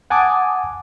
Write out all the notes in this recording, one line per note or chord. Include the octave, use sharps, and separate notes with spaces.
F#5 G#5 A5 D6 D#6